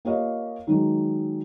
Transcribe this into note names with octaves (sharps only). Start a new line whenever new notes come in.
A#3 F4 G4 C#5 D#5 F5
D#3 F#3 G#3